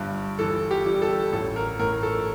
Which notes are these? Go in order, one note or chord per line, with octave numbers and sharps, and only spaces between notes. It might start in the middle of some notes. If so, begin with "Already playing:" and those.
Already playing: G1 G2
E3 A4
G4
G3
A4
A1 A4
A#4
A2 A#4
A4